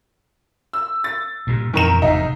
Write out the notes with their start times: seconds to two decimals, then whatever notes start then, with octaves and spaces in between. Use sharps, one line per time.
0.73 E6
1.04 A6
1.47 G2 A#2
1.73 F2 A#2 D#3 E3 A#4 E7
2.02 F1 E2 G#2 D#4